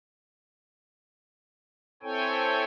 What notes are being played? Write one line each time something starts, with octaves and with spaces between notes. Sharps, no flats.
C4 E4 A4 C#5 G5 G#5